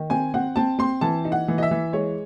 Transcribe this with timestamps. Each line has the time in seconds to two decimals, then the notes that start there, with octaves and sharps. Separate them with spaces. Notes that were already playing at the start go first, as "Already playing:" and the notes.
Already playing: D#3
0.10 C4 G#5
0.34 C4 F#5
0.56 C4 A5
0.79 C4 C6
1.01 E3 A5
1.25 D#4
1.32 F#5
1.48 E3
1.58 D#5
1.63 E5
1.71 E3
1.93 G#3 C#5